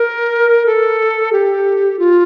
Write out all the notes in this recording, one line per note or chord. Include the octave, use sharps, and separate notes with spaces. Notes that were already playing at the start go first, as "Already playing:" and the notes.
Already playing: A#4
A4
G4
F4